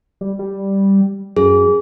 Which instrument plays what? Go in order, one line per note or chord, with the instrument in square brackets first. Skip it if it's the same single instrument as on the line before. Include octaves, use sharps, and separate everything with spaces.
[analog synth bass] G3
G3
[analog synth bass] F#2 [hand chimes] G#4